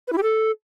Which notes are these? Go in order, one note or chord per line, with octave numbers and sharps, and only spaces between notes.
B4
E4
G4
A4